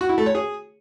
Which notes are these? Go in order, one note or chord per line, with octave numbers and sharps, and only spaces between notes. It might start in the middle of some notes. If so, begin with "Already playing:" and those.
F#4
E4
A3
C#5
G#4